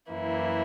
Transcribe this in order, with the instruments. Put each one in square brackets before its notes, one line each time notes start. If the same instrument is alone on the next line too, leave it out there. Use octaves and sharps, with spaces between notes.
[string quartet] F#2 E3 A#3 E4